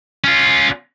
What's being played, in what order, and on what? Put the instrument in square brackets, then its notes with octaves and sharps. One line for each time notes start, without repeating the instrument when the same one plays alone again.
[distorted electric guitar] C#4 F4